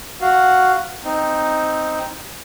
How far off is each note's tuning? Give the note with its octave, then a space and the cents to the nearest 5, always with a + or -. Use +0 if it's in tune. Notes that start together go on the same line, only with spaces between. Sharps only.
F#4 +0 F5 -5
C4 +0 D#4 +0